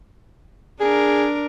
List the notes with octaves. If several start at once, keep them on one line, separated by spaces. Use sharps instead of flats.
D4 G#4 A#4